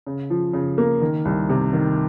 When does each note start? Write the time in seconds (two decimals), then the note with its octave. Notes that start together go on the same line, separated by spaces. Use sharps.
0.07 C#3
0.30 F3
0.53 C#3
0.78 A#3
1.01 D#3
1.25 C2
1.49 C3
1.73 D#3